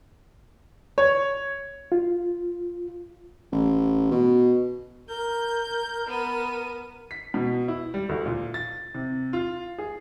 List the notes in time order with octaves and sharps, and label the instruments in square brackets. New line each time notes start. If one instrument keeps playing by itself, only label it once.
[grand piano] C#5
[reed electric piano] F4
[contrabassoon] A1
B2
[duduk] A#4 [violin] G6
[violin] B3 D#7
[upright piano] B6
B2
E4
G3
D2
A#2
A6
C3
F4
G#4